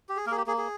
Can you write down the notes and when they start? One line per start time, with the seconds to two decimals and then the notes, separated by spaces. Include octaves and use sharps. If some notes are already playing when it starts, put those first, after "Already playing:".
0.09 G4
0.17 G#4
0.26 A#3 A#4
0.32 G#4
0.37 G4
0.47 A#3 G#4
0.58 G#4